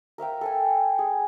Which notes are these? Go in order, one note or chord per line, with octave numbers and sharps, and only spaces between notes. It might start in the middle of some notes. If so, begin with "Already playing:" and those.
A#4 E5 F5 G5
A4 G5 G#5
G#4